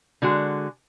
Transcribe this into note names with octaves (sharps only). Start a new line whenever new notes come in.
D3 G#3 F#4